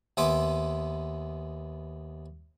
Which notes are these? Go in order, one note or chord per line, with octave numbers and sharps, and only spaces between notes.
D#2 B3 E5 G#5 C6 D6